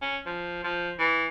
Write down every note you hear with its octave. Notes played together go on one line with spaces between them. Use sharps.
C#4
F3
F3
E3